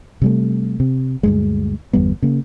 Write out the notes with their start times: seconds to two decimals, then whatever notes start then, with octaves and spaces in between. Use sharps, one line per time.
0.22 C3 G3 A3
0.80 C3
1.23 D2 G2 G#3
1.93 G1 E2 G3 B3
2.22 C#3 A#3